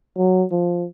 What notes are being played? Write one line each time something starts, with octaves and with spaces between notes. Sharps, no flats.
F#3
F3